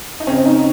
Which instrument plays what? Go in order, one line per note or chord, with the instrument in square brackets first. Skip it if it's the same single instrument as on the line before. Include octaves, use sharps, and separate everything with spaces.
[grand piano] D#4
[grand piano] C#3 C#4 [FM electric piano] C4
[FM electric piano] D#4